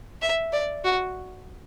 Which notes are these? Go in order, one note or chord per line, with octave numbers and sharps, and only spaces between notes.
E5
D5
F#4